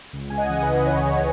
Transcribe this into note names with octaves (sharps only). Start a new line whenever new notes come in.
C#2
C#3 G#5
D#5 F#5
E3
B4 D#5
C#2
C#2 C#5
C#3